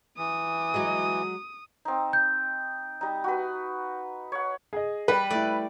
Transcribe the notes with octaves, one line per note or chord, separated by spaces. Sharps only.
E3 D#6
F#3 G#3
C4 D#4
G6
G3 D#4
F#4 B4
C#5 F#5
G#4 D#5
G3 B4
A3 E4 D5